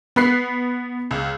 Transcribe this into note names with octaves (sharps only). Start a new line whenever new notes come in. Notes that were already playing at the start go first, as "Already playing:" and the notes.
B3 B4 F#6 B6 C7
C#2